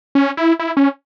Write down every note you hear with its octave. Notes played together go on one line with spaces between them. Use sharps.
C#4
E4
E4
C#4